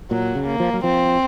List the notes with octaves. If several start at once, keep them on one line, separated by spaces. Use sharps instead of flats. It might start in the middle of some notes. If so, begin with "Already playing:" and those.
A#2 F#3
C#3
A#3
F3
F#3
F3 C4